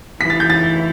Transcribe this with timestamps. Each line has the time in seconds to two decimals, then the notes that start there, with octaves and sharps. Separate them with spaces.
0.20 E3 B6
0.30 A6
0.40 G6
0.50 A6